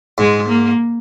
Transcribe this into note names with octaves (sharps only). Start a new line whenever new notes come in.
G#2 G#3
A#3